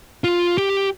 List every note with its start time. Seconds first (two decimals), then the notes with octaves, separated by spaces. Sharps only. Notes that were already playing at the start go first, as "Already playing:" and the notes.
0.24 F4
0.58 G4